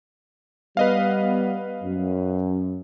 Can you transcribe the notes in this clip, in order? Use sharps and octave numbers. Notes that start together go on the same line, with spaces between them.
G3 B3 B4 D#5 F5
F#2